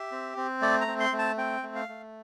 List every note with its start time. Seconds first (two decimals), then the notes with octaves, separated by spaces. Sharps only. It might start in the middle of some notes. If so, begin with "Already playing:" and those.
Already playing: G4 E5
0.12 C4
0.37 C4
0.62 A3 D5
0.81 A#5
0.87 C4
1.00 C6
1.13 A3
1.19 A5
1.37 C4 G5
1.63 A3
1.75 F5
1.88 A3